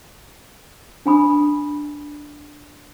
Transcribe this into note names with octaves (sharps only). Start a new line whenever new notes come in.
D4 G#5 B5 D#6